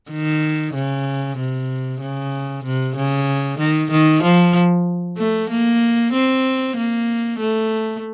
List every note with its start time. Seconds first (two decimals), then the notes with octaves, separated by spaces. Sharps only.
0.11 D#3
0.75 C#3
1.38 C3
2.01 C#3
2.65 C3
2.96 C#3
3.59 D#3
3.91 D#3
4.23 F3
5.18 A3
5.50 A#3
6.13 C4
6.77 A#3
7.40 A3